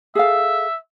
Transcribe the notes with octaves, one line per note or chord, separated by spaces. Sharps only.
G#4 A4 E5 F5